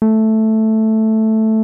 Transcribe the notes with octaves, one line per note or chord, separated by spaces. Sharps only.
A3